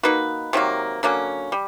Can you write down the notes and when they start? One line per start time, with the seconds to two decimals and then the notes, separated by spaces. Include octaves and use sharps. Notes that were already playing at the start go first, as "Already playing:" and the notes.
0.03 A#3 D#4 F#4 B4
0.53 C3 D#3 F#3 A#3
1.03 D3 F#3 A#3 C#4
1.52 G3